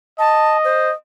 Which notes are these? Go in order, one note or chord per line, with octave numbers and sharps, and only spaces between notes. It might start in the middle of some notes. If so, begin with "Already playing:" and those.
D#5 A5
C5